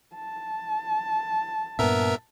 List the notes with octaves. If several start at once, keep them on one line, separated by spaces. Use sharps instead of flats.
A5
G2 A#2 B3 A#4 E5